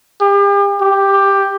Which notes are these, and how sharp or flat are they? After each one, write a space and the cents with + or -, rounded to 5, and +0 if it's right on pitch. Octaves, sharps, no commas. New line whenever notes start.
G4 +40
G4 +5